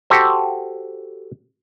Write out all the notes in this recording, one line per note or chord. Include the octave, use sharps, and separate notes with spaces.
F#4 G4 A4 C5